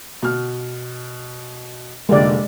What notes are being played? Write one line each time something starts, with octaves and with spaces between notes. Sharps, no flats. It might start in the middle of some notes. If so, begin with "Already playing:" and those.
B2 F6
F1 D3 G#3 A#3 G4 D5